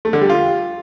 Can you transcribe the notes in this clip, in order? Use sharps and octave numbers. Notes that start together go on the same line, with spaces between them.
A3
D3
G3
F4